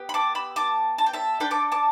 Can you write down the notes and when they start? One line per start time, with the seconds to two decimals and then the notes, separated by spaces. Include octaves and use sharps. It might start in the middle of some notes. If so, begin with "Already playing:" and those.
Already playing: B3 G4
0.09 B5
0.14 A5 D6
0.35 B5 E6
0.56 A5 D6
0.98 A5
1.06 G5
1.14 E5 A5
1.40 D4 A4 G5 B5
1.51 A5 D6
1.72 A5 D6